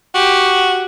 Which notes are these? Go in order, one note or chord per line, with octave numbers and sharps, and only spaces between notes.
F#4 G4